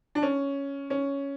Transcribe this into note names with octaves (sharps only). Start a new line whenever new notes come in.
D4
C#4
C#4